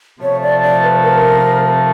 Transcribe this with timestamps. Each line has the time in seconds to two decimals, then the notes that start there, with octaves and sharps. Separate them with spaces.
0.22 C3 F3 A3 C#5
0.42 D5
0.63 D5
0.83 B4
1.03 A#4